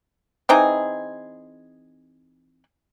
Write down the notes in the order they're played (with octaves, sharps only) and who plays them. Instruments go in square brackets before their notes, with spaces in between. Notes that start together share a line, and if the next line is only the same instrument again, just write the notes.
[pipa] E3 C4 D#4 G#4